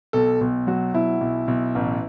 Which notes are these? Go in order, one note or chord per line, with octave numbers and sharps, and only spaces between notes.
B1 A4
B1
F#3 F#4
B2 E4
B1
B1
A1